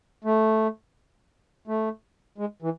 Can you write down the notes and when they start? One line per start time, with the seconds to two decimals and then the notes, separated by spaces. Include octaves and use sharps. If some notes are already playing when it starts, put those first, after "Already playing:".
0.24 A3
1.67 A3
2.38 G#3
2.62 E3